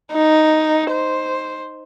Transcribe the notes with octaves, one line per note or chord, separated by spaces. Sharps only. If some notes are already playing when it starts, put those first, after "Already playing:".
D#4
C5